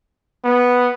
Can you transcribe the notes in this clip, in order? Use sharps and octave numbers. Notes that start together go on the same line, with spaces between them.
B3